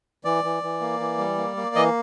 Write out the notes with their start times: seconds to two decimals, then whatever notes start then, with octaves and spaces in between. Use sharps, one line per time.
0.25 E3 D5
0.44 E3
0.63 E3
0.81 A#3
1.00 E3
1.18 G3
1.38 A#3
1.57 A#3
1.75 E3 D#5